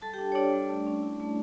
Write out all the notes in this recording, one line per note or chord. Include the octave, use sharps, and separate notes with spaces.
G3 A4 A5
D4 G4 G5
C#5
D4 F4 D5
G3
A3
C#4
E4
A3